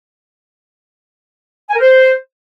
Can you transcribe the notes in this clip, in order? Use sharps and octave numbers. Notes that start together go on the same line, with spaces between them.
G#5
A#4
C5